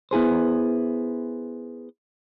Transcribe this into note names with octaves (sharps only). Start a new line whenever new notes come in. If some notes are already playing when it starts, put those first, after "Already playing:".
B3 E4 G#4 C5